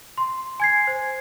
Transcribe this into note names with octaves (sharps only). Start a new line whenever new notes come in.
C6
G#5 G#6 C7
C5